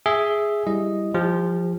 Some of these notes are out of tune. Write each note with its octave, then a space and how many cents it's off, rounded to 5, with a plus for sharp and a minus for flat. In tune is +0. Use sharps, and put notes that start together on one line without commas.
G#4 +0 E5 +0
G3 +0 E4 +0 D#5 +0
F3 +0 G4 +45